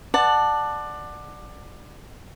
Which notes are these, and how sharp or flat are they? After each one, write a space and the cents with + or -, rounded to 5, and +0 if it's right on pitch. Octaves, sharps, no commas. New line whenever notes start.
D5 +20 F#5 +0 A5 +0